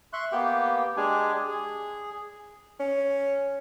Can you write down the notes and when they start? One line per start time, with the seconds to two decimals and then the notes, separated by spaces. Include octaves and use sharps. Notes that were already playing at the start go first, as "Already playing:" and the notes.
0.13 E5 C6 C#6 F#6
0.32 A#3 B3 G4 G5
0.97 G#3 D4 G4 G#4 G#5
1.48 G#4
2.80 C#4